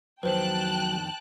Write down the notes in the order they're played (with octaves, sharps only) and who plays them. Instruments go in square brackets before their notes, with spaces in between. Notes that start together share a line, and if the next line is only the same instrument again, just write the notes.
[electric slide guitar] F2 D#3 [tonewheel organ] F#3 [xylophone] B4 C5 [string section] G5 A5 F#6